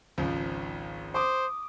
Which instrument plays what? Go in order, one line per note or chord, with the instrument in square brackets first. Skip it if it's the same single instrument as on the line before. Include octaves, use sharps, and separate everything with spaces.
[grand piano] G#1 C#2 F3
[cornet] C5 [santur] D6 D#6